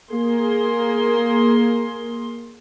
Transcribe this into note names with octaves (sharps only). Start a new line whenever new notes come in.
A#3 G#4 C6